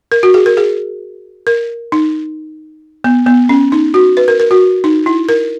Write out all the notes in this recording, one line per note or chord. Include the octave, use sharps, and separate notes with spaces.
A#4
F#4
G#4
A#4
G#4
A#4
D#4
B3
B3
C#4
D#4
F#4
B4
A#4
A#4
F#4
D#4
E4
A#4